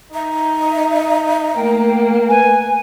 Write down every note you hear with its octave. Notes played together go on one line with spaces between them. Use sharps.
D#4 E5 A#5
A3 A#3 G5
B4 G#5